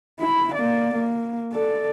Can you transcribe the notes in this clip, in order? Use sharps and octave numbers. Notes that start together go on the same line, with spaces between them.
E4 B5
A#3 D5
A#3
A4 D5